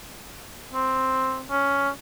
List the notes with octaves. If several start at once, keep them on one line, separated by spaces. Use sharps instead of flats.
C4
C#4